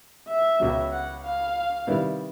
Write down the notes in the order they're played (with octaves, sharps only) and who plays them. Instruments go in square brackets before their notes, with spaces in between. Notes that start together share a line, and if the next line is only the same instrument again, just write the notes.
[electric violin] E5
[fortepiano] C#2 B2 F#3
[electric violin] F#5
F5
[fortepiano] C3 D#3 G3 B3 E4